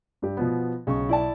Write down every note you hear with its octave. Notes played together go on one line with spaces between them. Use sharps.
G2 G4
B2 F3 B3
B1 C#3 C#6
E4 D5 A5